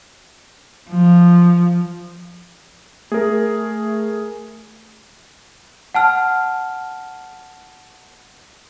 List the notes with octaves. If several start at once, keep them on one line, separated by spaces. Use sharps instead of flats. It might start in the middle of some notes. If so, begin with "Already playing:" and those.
F3
A3 G#4 A#4
F#5 A5 F6